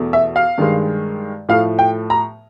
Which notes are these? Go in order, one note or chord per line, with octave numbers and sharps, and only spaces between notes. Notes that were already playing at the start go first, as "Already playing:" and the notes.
Already playing: E2 B2 A3
E5
F5
G2 D#3 G#3
A2 F3 A3 F5
G5
A#5